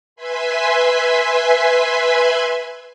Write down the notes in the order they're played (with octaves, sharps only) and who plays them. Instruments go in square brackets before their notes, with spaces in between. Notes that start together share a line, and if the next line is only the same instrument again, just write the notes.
[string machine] B4 E5 G#5 B5 C6